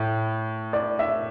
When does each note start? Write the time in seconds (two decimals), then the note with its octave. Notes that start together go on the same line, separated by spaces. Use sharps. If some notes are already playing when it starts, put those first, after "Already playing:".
Already playing: A2
0.73 D5
0.99 E5